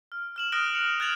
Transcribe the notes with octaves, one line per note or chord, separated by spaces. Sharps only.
F6
F6 E7 F#7
D#6 F6 F#6 A#6 D7 G7
C#7 F7
F#6 G#6 A6 D7 F7 F#7